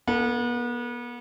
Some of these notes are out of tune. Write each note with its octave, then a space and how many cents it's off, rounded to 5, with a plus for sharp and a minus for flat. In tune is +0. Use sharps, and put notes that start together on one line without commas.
B3 -35 A4 +15